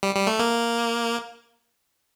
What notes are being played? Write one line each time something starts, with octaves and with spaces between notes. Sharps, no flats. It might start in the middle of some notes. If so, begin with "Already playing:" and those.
G3
G3
A3
A#3